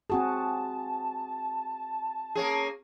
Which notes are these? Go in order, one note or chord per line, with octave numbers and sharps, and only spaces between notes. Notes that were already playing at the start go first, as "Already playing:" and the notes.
C4 F#4 G#4 A5
A#3 C#4 G#4